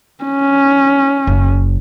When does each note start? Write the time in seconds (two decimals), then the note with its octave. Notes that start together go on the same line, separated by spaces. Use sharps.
0.24 C#4
1.27 F#1